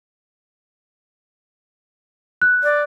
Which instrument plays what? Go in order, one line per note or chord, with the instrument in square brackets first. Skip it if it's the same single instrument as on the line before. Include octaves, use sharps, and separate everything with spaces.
[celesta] F#6
[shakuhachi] D5